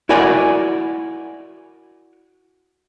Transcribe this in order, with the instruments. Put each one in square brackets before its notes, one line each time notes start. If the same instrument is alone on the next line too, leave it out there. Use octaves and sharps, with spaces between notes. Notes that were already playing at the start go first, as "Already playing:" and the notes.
[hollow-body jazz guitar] E4 F#4 A#4 D5 G#5